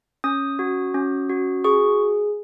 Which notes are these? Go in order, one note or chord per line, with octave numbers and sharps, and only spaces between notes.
C#4 D#6
F#4
C#4
F#4
G#4 C#6